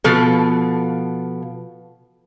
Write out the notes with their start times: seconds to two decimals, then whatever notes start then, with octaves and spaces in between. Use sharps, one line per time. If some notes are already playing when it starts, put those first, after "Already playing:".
0.04 B2 F3 A4